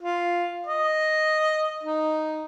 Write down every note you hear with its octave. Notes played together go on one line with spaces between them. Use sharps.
F4
D#5
D#4